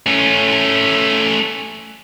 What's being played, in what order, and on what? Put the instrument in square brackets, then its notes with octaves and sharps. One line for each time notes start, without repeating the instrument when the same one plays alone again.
[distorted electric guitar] A3 C#4